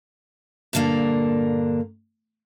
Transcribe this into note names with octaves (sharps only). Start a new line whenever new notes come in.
G2 A#2 D3 G3 A#3 D4